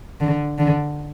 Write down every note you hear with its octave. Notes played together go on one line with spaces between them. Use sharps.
D3
D3